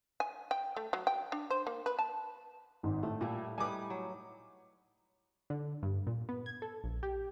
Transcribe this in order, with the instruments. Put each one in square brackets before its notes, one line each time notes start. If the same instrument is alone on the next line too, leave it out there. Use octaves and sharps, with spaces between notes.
[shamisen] G#5
G5
A3
F#3
G5
D4
C5
A#3
B4
A5
[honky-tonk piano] G#1 G#2
[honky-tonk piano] A2 [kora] A3
[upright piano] A#2 [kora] G3 E4
[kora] G3 D#4 B4 [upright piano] G#5 D6
[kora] F#3
[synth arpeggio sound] D3
G2
A#2
B3
G#6
A4
A#1
G4